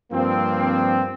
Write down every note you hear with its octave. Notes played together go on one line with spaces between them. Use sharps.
G2 F3 A#3 C4